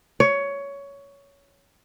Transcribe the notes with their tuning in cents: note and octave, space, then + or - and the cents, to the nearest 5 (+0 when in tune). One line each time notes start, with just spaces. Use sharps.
C#5 +15